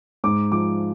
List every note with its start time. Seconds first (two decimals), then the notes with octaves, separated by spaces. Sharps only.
0.24 G#2 D6
0.52 F3 D6